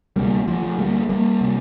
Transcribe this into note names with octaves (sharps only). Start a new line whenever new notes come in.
D2 C3 G3 A#3
F3 A3
F3 A3
D2 D3 G3 A#3
G3 A#3
C3